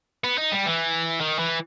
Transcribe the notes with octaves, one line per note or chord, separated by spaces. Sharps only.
B3
D#4
G3
E3
D#3
E3